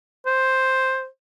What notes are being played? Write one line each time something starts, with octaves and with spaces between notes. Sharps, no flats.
C5